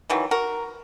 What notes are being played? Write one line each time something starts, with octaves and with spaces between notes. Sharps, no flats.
D#3 E3 F#3
F#4 A#4